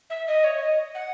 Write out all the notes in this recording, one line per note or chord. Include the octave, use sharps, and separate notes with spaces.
E5
D#5
C#5
D#5
F#5